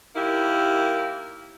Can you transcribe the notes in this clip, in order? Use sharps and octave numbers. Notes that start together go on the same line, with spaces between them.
D#2 A#3 E4 G4